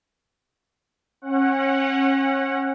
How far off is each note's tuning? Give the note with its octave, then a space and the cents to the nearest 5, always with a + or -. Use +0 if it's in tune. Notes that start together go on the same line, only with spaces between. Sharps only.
C#4 -35 F#5 +0